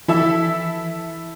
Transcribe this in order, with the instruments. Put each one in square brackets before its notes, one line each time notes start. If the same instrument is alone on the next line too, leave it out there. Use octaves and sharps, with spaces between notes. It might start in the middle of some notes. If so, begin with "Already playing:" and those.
[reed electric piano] E3 [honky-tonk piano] E4 A4 E5